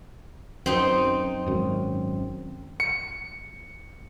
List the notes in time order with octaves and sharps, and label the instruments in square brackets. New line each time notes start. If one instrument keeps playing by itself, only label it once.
[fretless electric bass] F#2 [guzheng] C4 D#4
[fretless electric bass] G#1 F#2
[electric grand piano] C#7